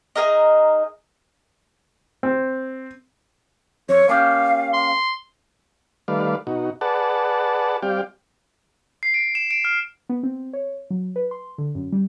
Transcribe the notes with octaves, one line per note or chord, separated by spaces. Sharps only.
D#4 G#4 A#4 D#5
C4
F2 C#5
A#3 C#4 G4 F5
C6
D#3 G3 A3 B4 D5 F5
B2 D#4 F#4
G#4 B4 D5 F#5 A5
G3 C4 G4 D5 F5 G5
C7
D7
E7
D7
F6
B3
C4
C#5
F#3
B4
C6
D3
F#2
G3